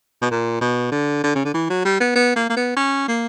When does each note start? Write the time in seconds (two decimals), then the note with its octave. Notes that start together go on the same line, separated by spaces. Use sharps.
0.22 B2
0.31 A#2
0.61 B2
0.92 D3
1.24 D3
1.35 C#3
1.45 D3
1.54 E3
1.70 F#3
1.85 G3
2.00 B3
2.15 B3
2.36 A#3
2.50 A#3
2.57 B3
2.77 C#4
3.08 A#3